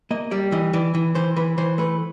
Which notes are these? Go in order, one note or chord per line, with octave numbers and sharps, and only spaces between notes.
A#3 D#5
G3 D5
E3 D#5
E3 D5
E3
E3 C5
E3 B4
E3 C5
A3 B4